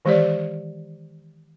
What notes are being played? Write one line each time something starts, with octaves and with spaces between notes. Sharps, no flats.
D#3 E3 G#3 G4 C#5 D5